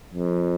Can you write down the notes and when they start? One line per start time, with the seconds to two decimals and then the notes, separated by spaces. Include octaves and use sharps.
0.14 F2